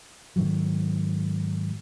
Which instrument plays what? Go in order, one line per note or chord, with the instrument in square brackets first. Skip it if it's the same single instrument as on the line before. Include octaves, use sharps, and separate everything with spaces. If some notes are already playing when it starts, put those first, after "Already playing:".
[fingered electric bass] G#2 D#3 F#3